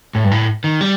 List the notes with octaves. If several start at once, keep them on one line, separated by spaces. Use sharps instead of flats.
A2
G2
A2
D#3
G3